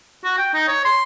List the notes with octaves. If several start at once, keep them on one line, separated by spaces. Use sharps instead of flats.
F#4
G5
D#4
C#5
C6